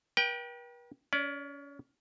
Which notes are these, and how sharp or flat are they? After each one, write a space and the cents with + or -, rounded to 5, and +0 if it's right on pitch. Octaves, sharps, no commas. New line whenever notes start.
B4 -45 G5 +0
C#4 +30 D5 +0